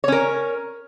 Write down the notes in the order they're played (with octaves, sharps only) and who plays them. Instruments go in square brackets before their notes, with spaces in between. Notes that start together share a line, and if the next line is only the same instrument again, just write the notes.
[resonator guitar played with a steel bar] C#5
C#4
A#4